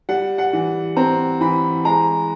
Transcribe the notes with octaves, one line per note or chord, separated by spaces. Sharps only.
G3 F#5
F#5
E3
C4 A#5
E3 B5
G#3 A#5